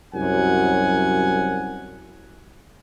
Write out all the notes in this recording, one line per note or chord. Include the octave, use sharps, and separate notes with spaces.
C2 F#2 F#3 F#5 G#5